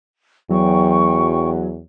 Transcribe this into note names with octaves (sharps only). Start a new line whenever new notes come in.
E2 F#3 G5 C#6